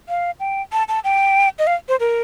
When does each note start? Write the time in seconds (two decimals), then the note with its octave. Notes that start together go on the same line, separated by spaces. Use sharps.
0.09 F5
0.40 G5
0.72 A5
0.88 A5
1.04 G5
1.59 D#5
1.67 F5
1.88 C5
2.00 A#4